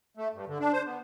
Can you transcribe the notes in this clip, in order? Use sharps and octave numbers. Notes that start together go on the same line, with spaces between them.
A3
G2
D3
D4
C5
B3